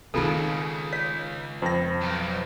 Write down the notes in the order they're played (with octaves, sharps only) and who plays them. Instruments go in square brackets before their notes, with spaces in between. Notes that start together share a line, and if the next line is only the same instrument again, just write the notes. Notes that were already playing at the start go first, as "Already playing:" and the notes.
[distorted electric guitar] C#2 [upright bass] D#3 C4 [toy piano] D#4 F4 A4 [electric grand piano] G#4
[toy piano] C#5 [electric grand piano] B6
[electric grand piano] F2 A#6 [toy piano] C5 G5
[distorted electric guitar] B1